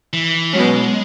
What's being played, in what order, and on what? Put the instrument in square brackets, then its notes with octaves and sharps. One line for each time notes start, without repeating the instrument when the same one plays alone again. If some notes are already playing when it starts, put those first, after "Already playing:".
[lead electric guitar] E3
[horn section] B2 F#3 C#4 [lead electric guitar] G#3